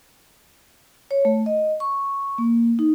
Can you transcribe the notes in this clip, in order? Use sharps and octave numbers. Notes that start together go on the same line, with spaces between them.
C#5
A3
D#5
C#6
A#3
D#4